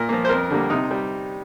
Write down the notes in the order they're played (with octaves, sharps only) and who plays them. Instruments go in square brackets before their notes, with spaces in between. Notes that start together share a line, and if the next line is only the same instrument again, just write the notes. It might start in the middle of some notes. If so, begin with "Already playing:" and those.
Already playing: [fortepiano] A#2 A#4
F3 A#3
C5
F2 A#4
D3 G3 A#3
C3 D#4
G3